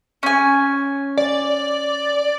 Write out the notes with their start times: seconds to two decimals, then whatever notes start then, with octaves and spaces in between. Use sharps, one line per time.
0.23 C#4 G#5
1.18 D5